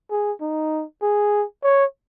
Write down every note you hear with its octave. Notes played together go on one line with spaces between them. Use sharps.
G#4
D#4
G#4
C#5